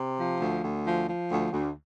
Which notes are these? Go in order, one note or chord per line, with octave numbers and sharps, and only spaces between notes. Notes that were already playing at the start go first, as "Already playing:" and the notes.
Already playing: C3
F3
D2
D2
F3
F3
D2
D2